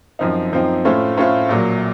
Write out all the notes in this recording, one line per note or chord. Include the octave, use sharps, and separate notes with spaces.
F#2 F3 C4 D#4
F#2 F3 C4 D#4
A2 A3 C#4 F4 C5
A2 A3 C#4 F4 C5
A#1 A#2 F#3